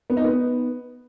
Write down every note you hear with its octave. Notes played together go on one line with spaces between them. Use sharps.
B3
D#4
B3